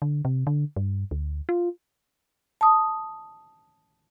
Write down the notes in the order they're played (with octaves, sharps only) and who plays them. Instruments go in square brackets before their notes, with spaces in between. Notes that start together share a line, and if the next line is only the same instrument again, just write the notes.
[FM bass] D3
C3
D3
G2
D2
F4
[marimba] A5 D#6